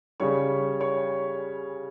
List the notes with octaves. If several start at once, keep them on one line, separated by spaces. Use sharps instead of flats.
C#3 G3 C#5 C#6
C#5 C#6